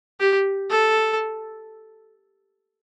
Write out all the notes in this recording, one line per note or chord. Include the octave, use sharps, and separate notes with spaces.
G4
A4